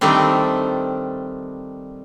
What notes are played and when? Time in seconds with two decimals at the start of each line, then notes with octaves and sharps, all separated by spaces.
0.01 D#3 G3 A3 C4 D4